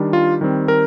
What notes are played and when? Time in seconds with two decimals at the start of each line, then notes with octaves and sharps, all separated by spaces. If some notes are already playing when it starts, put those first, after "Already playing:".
Already playing: D#3 G3 D4
0.13 F4
0.41 D#3 G3 C4
0.68 A#4